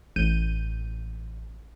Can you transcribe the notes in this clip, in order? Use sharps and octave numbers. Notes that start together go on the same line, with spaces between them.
A1 G6 D#7